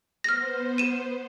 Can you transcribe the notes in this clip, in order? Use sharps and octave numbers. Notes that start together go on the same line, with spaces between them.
B3 C5 F6 A#6
D#7 E7